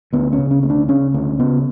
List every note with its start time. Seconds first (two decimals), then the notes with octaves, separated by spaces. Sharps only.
0.13 D2 B3
0.33 C#4
0.39 C#3
0.51 C#4
0.63 D2 C#4
0.70 D4
0.88 C#3 C#4
1.14 D2 C#4
1.39 C#3 B3